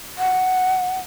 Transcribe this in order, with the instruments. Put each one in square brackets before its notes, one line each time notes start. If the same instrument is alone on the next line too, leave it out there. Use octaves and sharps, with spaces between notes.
[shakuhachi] F#5